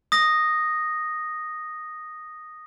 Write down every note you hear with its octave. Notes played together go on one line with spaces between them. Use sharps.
D#6 A#6